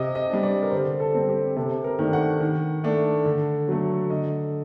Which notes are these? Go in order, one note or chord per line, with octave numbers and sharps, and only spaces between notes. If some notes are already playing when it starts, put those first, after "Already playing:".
Already playing: C3 D#5
D#5
G3 D4
D5
A#4
D3 C5
A4
G3 C4
G4
C3 A4
A#4
D#3 A3 D4
F#5
D#3
A3 D4
D3
F#3 A3
D3 D#5